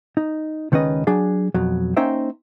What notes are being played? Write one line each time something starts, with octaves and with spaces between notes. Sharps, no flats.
D#4
C#2 D#3 C#4 B4 D#5
F#3 D4 G#4 A5
F2 B2 F#3
A#3 C#4 D#4 C5 E5 G5